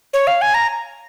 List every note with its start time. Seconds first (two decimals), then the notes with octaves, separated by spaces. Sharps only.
0.13 C#5
0.27 F5
0.42 G#5
0.54 A#5